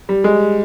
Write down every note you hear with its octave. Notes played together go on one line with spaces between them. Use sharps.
G3
G#3